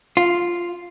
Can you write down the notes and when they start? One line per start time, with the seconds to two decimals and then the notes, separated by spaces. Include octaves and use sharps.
0.17 F4